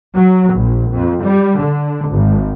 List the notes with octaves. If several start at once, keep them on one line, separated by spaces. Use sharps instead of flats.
F#3
A#1
F2
G3
D3
G#1